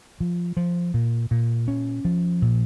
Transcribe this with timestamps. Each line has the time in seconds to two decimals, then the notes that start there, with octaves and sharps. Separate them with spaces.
0.20 F3
0.57 F3
0.94 A#2
1.31 A#2
1.68 C#4
2.05 F3
2.42 A#2